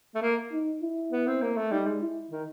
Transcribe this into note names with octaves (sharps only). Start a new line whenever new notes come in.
A3
A#3
D#4
E4
B3
C4
A#3
A3
G3 D#4
G#3
E4
D#3